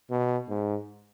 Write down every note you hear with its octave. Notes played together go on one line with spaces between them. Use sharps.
B2
G#2